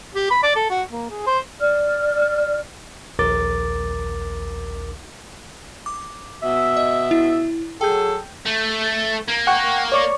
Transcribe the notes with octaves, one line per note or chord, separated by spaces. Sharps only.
G4
B5
D5
A4
F#4
A#3
G#4
C5
D5 F6
A#1 D#2 A#4 D6 A6
D6
B2 E5
D#5
E4
F#3 G#4 A4 G5 G6
A3
A#3
F#5 G5 C#6
C#5 D5 C#6